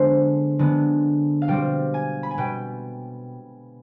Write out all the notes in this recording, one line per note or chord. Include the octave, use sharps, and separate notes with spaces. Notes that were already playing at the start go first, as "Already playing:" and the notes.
Already playing: D3 G#3 B3 C5
D3 G#3 B3
F5
B2 G3 C4 G5
G#5
B5
G#5
B2 G5